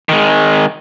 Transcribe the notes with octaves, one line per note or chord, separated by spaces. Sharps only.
D#3 G#3